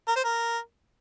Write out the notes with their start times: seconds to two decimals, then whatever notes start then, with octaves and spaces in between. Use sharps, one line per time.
0.08 A#4
0.16 C5
0.24 A#4